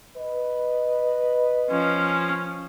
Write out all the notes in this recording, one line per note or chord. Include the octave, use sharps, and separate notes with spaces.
B4 D#5
F3 C#4